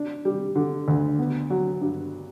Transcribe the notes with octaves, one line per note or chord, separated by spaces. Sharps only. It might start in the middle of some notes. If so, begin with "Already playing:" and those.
Already playing: D4
G3
D3
D2
B3
F#3
G2